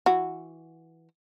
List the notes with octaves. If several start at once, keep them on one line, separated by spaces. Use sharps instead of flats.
E3 F#4